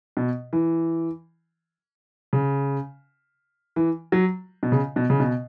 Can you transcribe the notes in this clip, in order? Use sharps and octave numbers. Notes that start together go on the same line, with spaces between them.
B2
E3
C#3
E3
F#3
B2
C#3
B2
C#3
B2